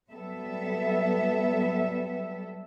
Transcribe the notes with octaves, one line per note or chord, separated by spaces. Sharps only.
F#3 G3 B3 A4 E5